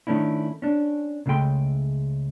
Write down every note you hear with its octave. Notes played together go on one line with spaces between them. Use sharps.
D#3 A3 C#4 D4 E4
C#4 D4
C#2 C#3 G#3 A3 G5 C6